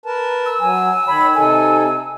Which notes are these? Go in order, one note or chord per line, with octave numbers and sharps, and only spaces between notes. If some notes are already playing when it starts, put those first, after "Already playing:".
A#4 B4 A5
E6
F#3 G#5
D#3 C#5 B5
C3 D#4 A4 G#5